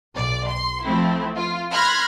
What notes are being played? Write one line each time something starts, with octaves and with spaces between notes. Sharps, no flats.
B1 D5
C6
F3 A3 C4 E4
F4
B5 C6 F6 F#6 G#6 A#6